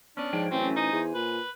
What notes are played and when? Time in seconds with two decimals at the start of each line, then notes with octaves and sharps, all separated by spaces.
0.17 B3 C#4 D4
0.33 G#2 F3 C#5 G5
0.51 A1 F#3 A3 C4 C#4
0.76 D#4 C5 G#5
0.92 E2
1.14 A#2 B4